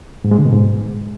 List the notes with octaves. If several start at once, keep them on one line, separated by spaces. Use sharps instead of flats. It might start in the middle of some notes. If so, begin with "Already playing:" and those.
G#2
G#3
D3
B2
G#2